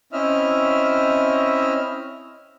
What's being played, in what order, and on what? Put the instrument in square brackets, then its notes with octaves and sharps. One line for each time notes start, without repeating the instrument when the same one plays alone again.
[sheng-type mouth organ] C4 C#4 E4 D#5 E5 F6